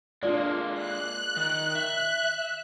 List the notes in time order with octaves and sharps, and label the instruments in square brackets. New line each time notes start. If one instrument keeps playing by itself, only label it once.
[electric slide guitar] G#3 A#3 [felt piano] D4 F4 D5
[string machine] F#6
[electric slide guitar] D#3
E5